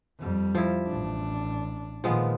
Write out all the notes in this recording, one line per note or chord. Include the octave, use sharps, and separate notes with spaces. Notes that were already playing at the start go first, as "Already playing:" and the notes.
F2 G3
F3 E4
A1 D4
A#2 D#3 F3 G#3 B3